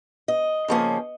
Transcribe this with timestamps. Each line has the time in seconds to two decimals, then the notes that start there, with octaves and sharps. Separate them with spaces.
0.28 D#5
0.68 C#3 F3 A#3 C#4